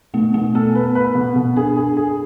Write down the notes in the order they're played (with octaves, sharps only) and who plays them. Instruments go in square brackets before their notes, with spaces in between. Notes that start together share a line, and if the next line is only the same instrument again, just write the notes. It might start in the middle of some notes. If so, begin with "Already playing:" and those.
[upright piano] B2 [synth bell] A3
[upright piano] B2 [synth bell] A3
[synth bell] B3 [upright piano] A4
[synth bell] B3 [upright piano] B4
[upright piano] B4
B2
B2
[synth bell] D4 [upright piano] G#4
[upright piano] G#4
G#4